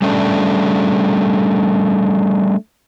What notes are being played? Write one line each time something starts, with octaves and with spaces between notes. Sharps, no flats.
G3 A3 C#4 D4